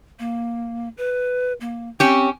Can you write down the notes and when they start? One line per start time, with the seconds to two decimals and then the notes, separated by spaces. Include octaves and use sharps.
0.19 A#3
0.98 B4
1.61 A#3
2.00 C4 C#4 G4